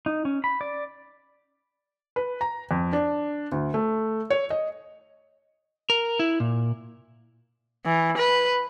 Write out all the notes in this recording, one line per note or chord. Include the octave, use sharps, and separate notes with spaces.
D#4
C#4
B5
D5
B4
A#5
F2
D4
D2
A3
C#5
D#5
A#4
E4
A#2
E3
B4